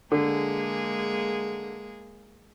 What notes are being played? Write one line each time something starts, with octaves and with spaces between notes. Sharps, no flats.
D3 G#3 A#3 G#4